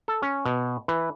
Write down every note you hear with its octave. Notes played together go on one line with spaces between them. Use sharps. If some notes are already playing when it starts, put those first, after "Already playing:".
A4
C#4
B2
E3